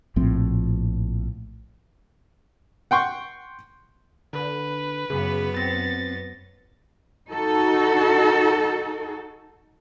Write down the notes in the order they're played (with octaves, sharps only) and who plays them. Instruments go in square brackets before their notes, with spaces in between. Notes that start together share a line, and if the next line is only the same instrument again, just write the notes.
[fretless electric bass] A#1 A2 F3 C4
[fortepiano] F#5 G5 C6 C#6
[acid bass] D3 [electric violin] B4
[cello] F#2 B3 [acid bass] C#3 [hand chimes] G#4
[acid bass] C4 [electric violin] A6 [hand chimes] A#6
[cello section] D#4 F#4 A4